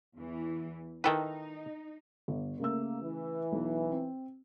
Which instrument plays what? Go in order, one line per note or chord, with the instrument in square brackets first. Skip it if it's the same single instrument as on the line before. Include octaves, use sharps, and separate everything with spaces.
[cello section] E2 E3
[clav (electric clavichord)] D#3 A4 B4 [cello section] D#4 [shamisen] E4 G5
[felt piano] G1
[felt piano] C#3 A3 E6 [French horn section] A#3
[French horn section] E3
[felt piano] B1
C4